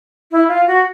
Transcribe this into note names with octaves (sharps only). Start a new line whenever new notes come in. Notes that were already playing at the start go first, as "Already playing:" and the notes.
E4
F4
F#4